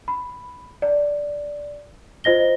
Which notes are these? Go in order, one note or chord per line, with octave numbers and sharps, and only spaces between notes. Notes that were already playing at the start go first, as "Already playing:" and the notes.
B5
D5
F4 C5 D#5 A#6 G7